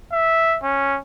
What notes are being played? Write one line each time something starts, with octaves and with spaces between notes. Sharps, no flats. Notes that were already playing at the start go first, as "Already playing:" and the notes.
E5
C#4